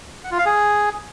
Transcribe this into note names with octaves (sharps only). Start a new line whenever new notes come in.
F#5
F4
F5
G#4